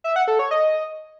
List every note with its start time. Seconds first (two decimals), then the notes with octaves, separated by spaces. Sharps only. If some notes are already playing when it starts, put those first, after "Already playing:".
0.04 E5
0.16 F#5
0.28 A4
0.39 C#5
0.51 D#5